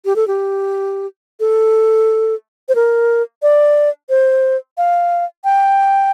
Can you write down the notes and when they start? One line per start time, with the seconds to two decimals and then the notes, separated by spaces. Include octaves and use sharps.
0.05 G4
0.16 A4
0.28 G4
1.40 A4
2.69 C5
2.75 A#4
3.42 D5
4.10 C5
4.78 F5
5.44 G5